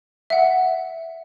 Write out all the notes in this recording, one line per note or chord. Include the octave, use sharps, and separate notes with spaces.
E5 F#5